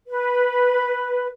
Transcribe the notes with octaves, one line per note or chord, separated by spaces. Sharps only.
B4